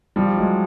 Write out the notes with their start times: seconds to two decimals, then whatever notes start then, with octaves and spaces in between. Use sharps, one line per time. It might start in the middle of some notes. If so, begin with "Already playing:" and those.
0.16 F3 G3
0.37 F#3 G#3